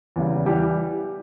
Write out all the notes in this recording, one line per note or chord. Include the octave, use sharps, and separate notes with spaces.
E2 C#3 G3
E3 G3 G4